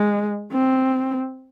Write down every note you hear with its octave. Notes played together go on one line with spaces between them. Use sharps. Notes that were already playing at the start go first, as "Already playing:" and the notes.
Already playing: G#3
C4